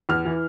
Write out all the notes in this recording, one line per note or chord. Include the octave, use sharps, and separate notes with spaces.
E2 F6
E3